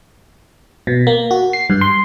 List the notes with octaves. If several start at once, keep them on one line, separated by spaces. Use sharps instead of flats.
B2
A#3
F#4
C7
G2
C6